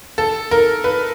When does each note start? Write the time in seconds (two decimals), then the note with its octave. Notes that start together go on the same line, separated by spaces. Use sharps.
0.18 A4
0.51 A#4
0.84 B4